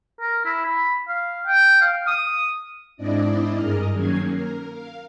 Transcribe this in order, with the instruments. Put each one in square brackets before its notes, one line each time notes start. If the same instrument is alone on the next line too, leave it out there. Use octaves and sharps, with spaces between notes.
[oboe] A#4
E4
B5
F5
G5
F5
D#6
[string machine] G#2 C4 D4 E4 D5 D#5
G2 G#4 A#4 D#5 F6
D#3 F#3 A#3 C#4 G#6 C7
A#4
F5